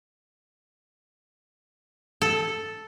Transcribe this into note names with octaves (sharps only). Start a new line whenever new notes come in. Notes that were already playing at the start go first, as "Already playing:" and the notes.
A4